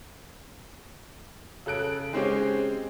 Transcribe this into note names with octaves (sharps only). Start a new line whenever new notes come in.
C#3 A4 F#6 D7
G#3 C4 C#4 G4